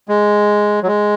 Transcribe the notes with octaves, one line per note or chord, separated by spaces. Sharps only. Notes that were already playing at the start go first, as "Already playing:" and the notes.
G#3
F#3
G#3